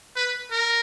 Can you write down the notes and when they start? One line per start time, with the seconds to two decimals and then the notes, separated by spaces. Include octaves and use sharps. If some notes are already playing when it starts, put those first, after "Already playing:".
0.16 B4
0.52 A#4